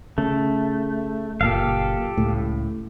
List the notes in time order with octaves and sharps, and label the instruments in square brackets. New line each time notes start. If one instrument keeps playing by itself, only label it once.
[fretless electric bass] C#3 [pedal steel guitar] A3
[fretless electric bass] F#1 A#2 [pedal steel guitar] G4 A4 F5
[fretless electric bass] C#2 A2